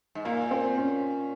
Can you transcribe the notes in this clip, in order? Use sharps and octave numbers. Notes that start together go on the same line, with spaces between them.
G#2
A#2 A#3
C4
C#4